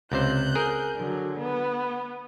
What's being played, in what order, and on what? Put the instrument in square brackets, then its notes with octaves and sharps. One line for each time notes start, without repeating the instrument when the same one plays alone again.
[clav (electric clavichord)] C#2 C3 C5 [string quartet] F#6 G6
[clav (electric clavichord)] G#4 A#4
[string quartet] D3 F#3
B3